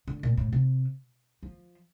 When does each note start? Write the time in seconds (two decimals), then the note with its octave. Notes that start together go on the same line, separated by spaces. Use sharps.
0.08 D3
0.23 A#2
0.37 A2
0.53 C3
1.43 F3